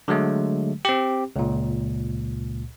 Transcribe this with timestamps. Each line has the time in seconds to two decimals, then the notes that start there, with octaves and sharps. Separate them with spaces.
0.08 D3 F#3 G#3 A3
0.85 C4 G4
1.36 C#2 A#2